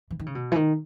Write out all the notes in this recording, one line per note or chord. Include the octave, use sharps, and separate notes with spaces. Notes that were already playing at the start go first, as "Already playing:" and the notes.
E3
D#3
C#3
B2
E3
D#3